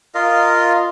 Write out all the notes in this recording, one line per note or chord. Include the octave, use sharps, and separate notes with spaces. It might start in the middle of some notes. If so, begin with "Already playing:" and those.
F4 A#4 D#5 F5